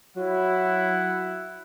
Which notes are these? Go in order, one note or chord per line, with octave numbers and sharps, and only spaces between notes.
F#3 E4 F#5